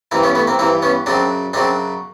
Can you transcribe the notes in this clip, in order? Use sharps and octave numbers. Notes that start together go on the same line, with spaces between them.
G2 E3 A#3 C4
B3 C#4
A3 B3
A#3 C4
G2 E3 A#3 C4
B3 C#4
F#2 C#3 F#3 C4 D4
F#2 C#3 F#3 C4 D4